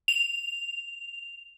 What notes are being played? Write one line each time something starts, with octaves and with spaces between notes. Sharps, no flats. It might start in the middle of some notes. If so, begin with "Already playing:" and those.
F7